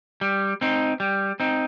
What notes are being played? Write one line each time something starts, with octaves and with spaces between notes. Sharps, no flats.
G3
C4 D#4
G3
C4 D#4